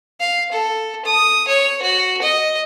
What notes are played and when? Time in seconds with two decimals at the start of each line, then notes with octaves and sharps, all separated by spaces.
0.20 F5
0.52 A4
1.05 D#6
1.48 C#5
1.82 F#4
2.22 D#5